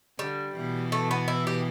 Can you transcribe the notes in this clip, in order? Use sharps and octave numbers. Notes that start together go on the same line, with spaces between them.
D3 G3
B2 E3
A3
B3
E4
G4